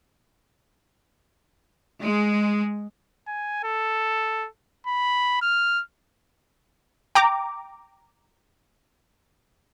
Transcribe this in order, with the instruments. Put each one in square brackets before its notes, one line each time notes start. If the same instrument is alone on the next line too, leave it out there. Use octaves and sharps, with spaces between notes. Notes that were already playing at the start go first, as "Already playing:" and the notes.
[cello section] G#3
[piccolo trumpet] G#5
A4
B5
F6
[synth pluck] G5 A#5 D6